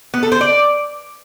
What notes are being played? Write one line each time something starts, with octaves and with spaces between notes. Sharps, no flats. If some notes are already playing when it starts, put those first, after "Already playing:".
B3
A4
C5
D5